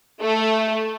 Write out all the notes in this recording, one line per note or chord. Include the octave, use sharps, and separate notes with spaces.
A3